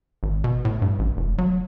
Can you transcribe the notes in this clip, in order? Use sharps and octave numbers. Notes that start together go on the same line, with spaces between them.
G#1
B2
A2
G2
A1
F1
F#3